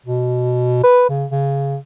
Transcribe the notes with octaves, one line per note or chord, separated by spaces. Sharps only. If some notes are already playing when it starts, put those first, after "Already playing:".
B2
B4
C#3
C#3